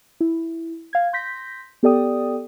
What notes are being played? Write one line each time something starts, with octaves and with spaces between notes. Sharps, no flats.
E4
F5 G#6
C6 G6 A#6 B6
B3 G4 A4 D5 G5 D#6